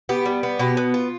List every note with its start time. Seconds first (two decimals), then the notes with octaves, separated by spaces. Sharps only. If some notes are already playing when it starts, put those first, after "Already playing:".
0.09 B3 G4
0.26 G3
0.43 B3
0.59 B2 G4
0.77 B3
0.94 F4